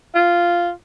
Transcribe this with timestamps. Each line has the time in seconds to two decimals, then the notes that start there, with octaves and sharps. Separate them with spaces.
0.15 F4